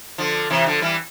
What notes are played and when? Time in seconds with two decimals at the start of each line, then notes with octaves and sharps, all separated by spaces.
0.18 D3 F3
0.50 C3 E3
0.66 D3 F3
0.81 E3 G3